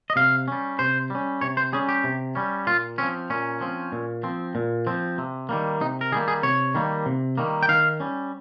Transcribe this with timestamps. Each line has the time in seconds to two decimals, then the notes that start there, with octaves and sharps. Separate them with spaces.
0.10 D#5
0.16 C3 F5
0.48 G3 C#4
0.79 C3 C5
1.10 G3 C#4
1.41 C3 C#5
1.57 C5
1.73 G3 C#4 G#4
1.89 G4
2.04 C3
2.35 G3 C#4
2.67 A#2 F4
2.98 F3 C4 C#4
3.30 A#2 C#4
3.61 F3 C4
3.92 A#2
4.23 F3 C4
4.55 A#2
4.87 F3 C4
5.18 C3
5.49 D#3 G3 A#3
5.81 C3 D#4
6.01 A#4
6.12 D#3 G3 A#3 G#4
6.28 G#4
6.43 C3 C#5
6.75 D#3 G3 A#3
7.06 C3
7.38 D#3 G3 A#3
7.63 G5
7.69 D#3 F5
8.00 G3 C#4